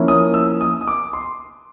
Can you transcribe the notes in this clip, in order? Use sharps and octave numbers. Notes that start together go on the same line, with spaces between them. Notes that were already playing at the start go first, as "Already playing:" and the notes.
Already playing: F3 A#3 C#4 E4
D#6
E6
D#6
D#6
D6
C6